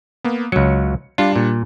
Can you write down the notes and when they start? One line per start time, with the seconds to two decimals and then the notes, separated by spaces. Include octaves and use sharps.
0.24 A#3 B3
0.52 C#2 F#3 C#7
1.18 G3 D4 F4
1.36 A#2